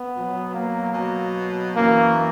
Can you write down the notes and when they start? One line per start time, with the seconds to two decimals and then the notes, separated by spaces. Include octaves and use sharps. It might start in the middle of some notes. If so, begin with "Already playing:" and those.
Already playing: B3
0.13 B2 F#3
0.54 A#3
0.94 B2 F#3
1.75 F#2 E3 A#3